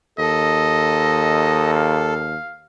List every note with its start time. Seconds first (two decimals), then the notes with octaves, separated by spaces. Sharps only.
0.19 D#2 A4 D#5
1.74 F5